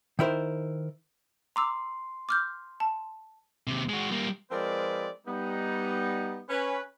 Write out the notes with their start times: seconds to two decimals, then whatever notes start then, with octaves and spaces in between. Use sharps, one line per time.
0.19 D#3 E4 A#4 C5
1.56 A#5 C6 D6 E6
2.29 D6 F6 G6
2.80 A5
3.67 D#2 C3
3.89 G#3 F#4
4.11 G3 A#3
4.51 F3 G#3 C4 A#4 B4 D5
5.26 G3 B3 D#4
6.49 C#4 B4